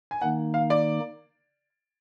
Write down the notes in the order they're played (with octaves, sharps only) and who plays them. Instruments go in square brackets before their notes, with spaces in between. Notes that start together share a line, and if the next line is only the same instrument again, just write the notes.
[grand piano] G#5
[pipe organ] D#3 A#3 D#4 [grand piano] F#5
[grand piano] F5
D5